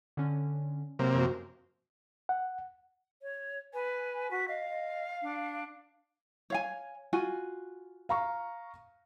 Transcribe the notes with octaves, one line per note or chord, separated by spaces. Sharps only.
D3 C#4
C3 F#3 A#3
F#2 F3 F#4
F#5
C#5
B4 G#5
F#4 B6
D#5 F5
D#5
D4
C#5 F5 G#5
F4 F#4 G#5
F5 A#5 C#6